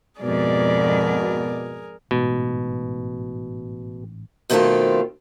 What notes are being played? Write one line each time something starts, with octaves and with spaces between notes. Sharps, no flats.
F2 G#2 B2 G#4 A#4 D5
A1 G#2 B2
F2 B2 D#3 A3 C4 F4